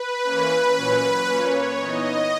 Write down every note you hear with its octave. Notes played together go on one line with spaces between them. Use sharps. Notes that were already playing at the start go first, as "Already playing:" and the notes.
Already playing: B4
E3 A#3 C#4
A#2 F#3 C#4
A#2 A#3 C#4 C#5
E3 B3 D#4 D#5